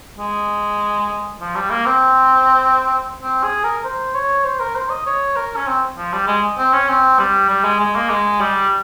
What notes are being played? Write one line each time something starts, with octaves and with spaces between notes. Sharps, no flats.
G#3
F3
G3
A#3
C4
C4
G#4
A#4
C5
C#5
C5
A#4
C5
D#5
C#5
A#4
C#4
C4
F3
G3
G#3
C4
C#4
C4
G3
G3
G#3
G#3
A#3
G#3
G3